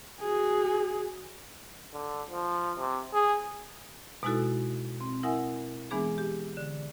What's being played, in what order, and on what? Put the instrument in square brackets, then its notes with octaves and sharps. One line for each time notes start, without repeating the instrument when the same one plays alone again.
[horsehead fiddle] F#4 G#4
[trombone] D3
F3
C3
G#4
[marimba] B2 G#3 D#4 E4 F#4 A4
C4
E4 A#4 E5 F#5 G#5 D#6
E3 G#3 B3 D4 G#4
G4
D3